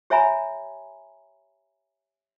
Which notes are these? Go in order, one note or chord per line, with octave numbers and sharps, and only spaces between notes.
G4 C#5 E5 G#5 A#5 B5